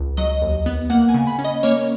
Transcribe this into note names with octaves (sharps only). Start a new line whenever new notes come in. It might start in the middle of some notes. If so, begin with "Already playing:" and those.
Already playing: C#2
F#3 D#5
D#2
B3
A#3 F#5
G#5
C#3
B5
C#4
D#5
A#3 C#5